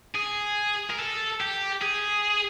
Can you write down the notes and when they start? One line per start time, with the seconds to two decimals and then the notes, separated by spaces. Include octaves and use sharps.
0.15 G#4
0.90 A#4
0.99 A4
1.40 G4
1.82 G#4